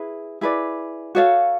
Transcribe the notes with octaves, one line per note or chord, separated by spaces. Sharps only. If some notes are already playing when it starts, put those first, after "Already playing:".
Already playing: E4 G#4 B4
E4 G#4 B4 D5
F#4 A4 C#5 F5